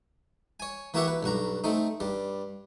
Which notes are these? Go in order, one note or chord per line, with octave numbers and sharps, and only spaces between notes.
C#5 G#5
E3 A#3 F#4 G4 E5 F#5
B4
B1 G2 F#4 A#5
A3 C4 D#4
G2 G3